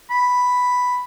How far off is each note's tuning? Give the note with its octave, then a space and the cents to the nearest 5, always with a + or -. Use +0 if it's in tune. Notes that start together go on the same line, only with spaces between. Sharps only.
B5 +5